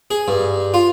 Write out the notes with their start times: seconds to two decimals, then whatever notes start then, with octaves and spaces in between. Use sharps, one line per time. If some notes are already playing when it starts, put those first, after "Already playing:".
0.11 G#4
0.28 G2
0.74 F4